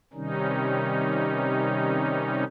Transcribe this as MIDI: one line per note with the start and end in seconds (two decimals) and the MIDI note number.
0.14 2.44 48
0.14 2.44 51
0.14 2.44 55
0.14 2.44 61
0.14 2.44 63